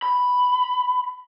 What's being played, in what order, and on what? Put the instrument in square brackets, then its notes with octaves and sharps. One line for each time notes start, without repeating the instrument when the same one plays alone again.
[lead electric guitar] B5